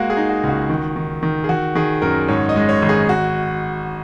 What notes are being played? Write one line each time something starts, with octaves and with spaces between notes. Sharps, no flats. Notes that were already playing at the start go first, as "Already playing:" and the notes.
Already playing: G#3 A#3 F#4
G#4
D#4
F#4
C#2
F#4
D#3
D#3
D#3
G#4
D#3 F#4
D#3 G#4
F#2 A#4
G#2 C#5
D#5
G#3
C#5
G#1
G#4
F#4